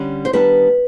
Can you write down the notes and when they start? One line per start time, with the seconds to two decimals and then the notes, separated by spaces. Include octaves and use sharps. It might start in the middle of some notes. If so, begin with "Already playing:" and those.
Already playing: D3 G3 C#4
0.25 C5
0.33 D#3 G3 B3 D4 B4